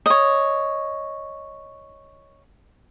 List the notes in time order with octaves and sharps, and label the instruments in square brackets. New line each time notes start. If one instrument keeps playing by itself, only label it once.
[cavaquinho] C#5 D#5